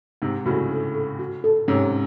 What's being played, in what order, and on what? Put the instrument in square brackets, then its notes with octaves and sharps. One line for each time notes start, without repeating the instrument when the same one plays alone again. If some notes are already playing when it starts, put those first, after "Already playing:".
[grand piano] G#2 C3 [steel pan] D#4
[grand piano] A2 C#3 [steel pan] F#4
[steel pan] A4
A4
F#4
A4
[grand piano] G#2 C3 [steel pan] C#4